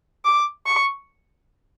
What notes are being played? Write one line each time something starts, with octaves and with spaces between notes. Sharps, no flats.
D6
C#6